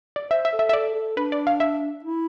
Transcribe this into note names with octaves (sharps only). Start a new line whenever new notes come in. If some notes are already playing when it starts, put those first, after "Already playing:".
D5
C5 E5
E5
A4
E5
E5
A4 D5
A4
D4 B4
D5
F5
E5
E4